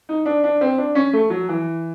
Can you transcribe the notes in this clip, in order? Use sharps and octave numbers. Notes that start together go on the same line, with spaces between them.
D#4
D4
D4
C4
D4
C#4
A3
F#3
E3